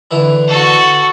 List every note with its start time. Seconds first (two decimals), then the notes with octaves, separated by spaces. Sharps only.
0.11 D3 E3 E4
0.48 F#4 A4